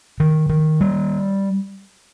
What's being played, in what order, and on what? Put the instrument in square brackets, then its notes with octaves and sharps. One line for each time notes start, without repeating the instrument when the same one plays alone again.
[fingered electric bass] D#3
D#3
G3